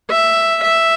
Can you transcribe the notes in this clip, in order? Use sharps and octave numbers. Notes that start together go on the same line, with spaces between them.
E5
E5